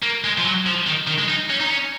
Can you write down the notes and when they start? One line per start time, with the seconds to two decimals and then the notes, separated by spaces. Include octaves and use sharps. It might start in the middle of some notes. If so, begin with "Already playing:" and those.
0.03 A#3
0.24 G#3
0.38 F3
0.44 F#3
0.66 F3
0.86 D#3
1.07 D#3
1.18 G#3
1.28 D#4
1.50 C#4
1.60 D#4
1.70 C#4